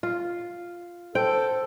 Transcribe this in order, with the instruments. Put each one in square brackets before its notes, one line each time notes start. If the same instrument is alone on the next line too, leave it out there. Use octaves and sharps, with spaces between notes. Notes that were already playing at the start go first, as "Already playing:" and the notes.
[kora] F4
[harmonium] A4 [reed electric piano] C5 [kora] G5